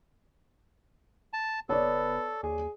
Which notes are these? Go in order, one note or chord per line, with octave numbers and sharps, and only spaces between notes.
A5
G1 B3 A4 C#5 D5
D#2 G#4